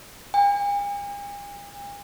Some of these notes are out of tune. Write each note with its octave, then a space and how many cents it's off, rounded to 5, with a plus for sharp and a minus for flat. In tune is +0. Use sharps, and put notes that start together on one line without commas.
G#5 -45